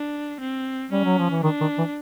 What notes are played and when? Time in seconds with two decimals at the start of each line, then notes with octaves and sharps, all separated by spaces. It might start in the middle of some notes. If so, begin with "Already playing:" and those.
Already playing: D4
0.40 C4
0.91 G3 C#4
1.05 F#3
1.18 F3
1.30 E3
1.43 D#3 D4
1.61 D#3
1.78 E3